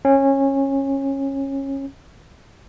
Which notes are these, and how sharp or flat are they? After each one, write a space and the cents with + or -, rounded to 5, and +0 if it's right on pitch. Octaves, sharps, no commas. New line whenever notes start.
C#4 -20